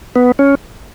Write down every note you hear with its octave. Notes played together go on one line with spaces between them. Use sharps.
B3
C#4